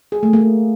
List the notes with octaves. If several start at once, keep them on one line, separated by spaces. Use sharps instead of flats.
G#4
A3
A#3